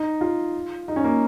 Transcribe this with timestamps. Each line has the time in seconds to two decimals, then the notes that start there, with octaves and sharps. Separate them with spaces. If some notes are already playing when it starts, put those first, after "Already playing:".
Already playing: D#4
0.21 F4
0.88 D#4
0.96 C#4
1.04 A#3